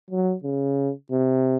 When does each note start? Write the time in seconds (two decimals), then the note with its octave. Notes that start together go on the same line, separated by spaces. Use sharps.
0.11 F#3
0.44 C#3
1.12 C3